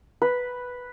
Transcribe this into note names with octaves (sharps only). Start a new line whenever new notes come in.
B4